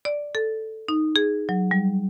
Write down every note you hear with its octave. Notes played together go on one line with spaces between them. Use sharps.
D5
A4
D#4
G#4
F#3
G3